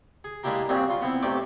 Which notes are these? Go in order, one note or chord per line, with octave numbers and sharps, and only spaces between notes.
G#4
G#3 A#3 D4 E4 G4 A#4
F#2 A#2 C#3 G3 C4 D4
C#3 F4
B3 C4 E4
B1 C3 A3 D5 G5 D6